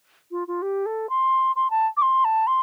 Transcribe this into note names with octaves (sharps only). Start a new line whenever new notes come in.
F4
F4
G4
A4
C6
C6
A5
D6
C6
A5
C6